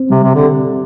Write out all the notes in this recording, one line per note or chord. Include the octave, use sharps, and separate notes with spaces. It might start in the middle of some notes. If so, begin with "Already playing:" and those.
Already playing: C4
C3 G3
C3
D3 G4